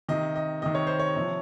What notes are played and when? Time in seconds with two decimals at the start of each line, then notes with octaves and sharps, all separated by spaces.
0.09 C3 D#3 D#5
0.36 D#5
0.62 C3 D#3 D#5
0.75 C#5
0.87 C5
1.00 C#5
1.16 C3 F3